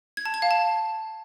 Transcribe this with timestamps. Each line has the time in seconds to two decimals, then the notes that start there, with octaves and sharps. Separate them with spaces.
0.17 G#6
0.26 A5
0.34 G#6
0.42 F5
0.51 A5